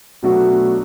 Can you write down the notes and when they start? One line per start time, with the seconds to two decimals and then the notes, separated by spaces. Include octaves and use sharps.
0.23 B2 F#3 A3 D4 F#4